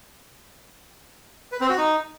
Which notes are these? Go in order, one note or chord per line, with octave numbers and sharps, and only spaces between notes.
B4
C4
F#4
D#4